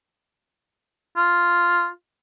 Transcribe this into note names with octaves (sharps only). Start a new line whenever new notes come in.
F4